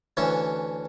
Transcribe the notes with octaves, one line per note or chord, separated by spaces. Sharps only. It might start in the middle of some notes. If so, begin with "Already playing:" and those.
D2 D3 E3 C#4